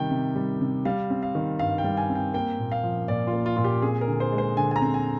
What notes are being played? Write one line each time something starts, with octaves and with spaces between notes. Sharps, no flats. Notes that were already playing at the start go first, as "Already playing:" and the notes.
Already playing: C3 D#3 G3 G5
C3
G3
C3
G3 F5
C4
F5
D#3
G2 F5
G5
G3
G#5
C4
G5
A#3 G5
A#2
F5
F3
A#2 D5
F4
A#3
F4
A#2 F4
G4
C4 G#4
A#4
D3
C5
G#3
C5
D3 G#5
G#5
A#5
C4
G#5